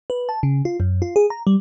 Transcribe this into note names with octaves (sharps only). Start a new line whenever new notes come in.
B4
A5
C#3
F4
F#2
F4
G#4
A#5
G3